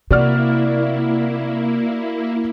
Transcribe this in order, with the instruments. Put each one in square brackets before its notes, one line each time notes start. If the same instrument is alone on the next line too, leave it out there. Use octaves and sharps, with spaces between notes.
[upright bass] C3 [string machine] A#3 E4 [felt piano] F#4 D5 F6